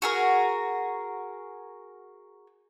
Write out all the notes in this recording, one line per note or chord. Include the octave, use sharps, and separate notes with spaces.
F#4 G#4 A#4